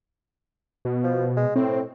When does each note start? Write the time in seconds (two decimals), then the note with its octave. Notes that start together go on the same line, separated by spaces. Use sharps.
0.85 B2
1.04 F3
1.37 G#3
1.56 A2 C4